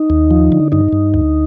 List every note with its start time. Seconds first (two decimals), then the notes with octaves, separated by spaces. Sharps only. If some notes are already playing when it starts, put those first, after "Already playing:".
Already playing: D#4
0.10 D#2
0.31 F3
0.52 D3
0.72 G2 D#4
0.92 G2
1.14 D2